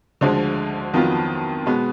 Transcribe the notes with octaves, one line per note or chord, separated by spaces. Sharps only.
D2 D3 F3 G#3
F2 D#3 F#3 B3 F4
B2 G#3 B3